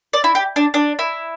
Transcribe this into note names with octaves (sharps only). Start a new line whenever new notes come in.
D5
E4
G4
D4
D4
E4